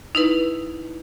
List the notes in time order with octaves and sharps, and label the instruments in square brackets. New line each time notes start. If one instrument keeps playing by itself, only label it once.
[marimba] D#4 E4 B4